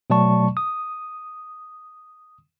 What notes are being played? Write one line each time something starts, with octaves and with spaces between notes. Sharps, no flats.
B2 F#3 A3 D5 A5 C#6
D#6